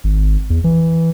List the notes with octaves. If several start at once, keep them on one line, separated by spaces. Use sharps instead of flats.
G#1
E2
E3